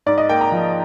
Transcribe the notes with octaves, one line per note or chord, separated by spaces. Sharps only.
G#2 D5
D#5
A#3 G5
A#5
F3